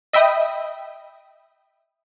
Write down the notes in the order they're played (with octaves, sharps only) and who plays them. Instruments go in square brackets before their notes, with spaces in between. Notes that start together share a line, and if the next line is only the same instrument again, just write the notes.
[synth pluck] D#5 E5 G5 B5 D#6